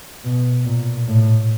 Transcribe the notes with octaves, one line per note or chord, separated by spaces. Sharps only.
B2
A#2
A2